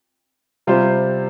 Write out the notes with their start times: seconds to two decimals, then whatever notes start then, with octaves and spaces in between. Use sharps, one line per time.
0.67 C3 G3 F4 C5